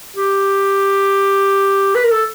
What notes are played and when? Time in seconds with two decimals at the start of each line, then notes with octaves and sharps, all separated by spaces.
0.16 G4
1.95 B4
2.03 A#4
2.11 A4